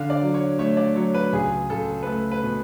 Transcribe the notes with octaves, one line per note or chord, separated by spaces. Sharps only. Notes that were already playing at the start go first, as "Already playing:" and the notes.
Already playing: D3 F5
D5
F#3
C#5
A3 C#5
D5
F#3 C#5
B4
C#2 G#4
C#2 A4
B4
A3 A4
B4
B2